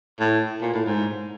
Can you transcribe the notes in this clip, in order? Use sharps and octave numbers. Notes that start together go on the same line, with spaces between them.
A2
A#2
A2
G#2